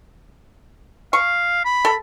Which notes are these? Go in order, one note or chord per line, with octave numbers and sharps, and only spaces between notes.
F5 C#6
B5
A4